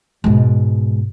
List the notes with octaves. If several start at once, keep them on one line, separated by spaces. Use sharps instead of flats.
G#2 B2